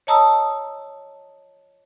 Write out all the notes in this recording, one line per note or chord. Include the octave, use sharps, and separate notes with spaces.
C#5 D#5 A5 A#5 D#6 E6